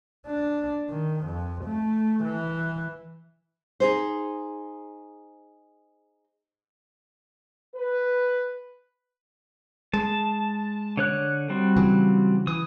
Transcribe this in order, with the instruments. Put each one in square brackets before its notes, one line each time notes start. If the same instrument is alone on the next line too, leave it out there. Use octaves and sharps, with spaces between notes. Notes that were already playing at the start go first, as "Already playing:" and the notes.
[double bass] D4
D#3
F2
A3
E3
[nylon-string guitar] D#4 G#4 C5
[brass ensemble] B4
[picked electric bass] G#3 [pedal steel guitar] A5
[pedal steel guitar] D3 C#5 F#6
G3 C4 F#4
[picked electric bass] C#3 E3 F#3
[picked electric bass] E3 [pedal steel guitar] D#6